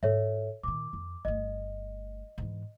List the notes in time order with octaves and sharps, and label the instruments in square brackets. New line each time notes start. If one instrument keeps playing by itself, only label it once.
[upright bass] G#2 F4 [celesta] A4 C#5 E5
[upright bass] A#2 D#3 [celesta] D6
[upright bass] F2
[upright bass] G1 A3 [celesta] D#5
[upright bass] G#2 E3